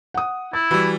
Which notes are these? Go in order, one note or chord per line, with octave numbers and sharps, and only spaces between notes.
F#5 D#6
E4 A6
E3 G3 F#4 B5 E6